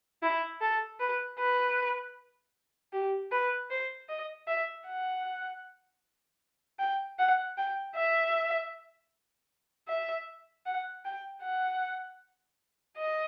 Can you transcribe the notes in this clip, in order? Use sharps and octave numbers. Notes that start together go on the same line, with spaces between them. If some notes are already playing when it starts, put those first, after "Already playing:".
E4
A4
B4
B4
G4
B4
C5
D#5
E5
F#5
G5
F#5
G5
E5
E5
F#5
G5
F#5
D#5